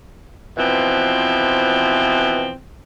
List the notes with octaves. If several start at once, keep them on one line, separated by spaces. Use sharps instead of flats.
B2 E3 F3 C4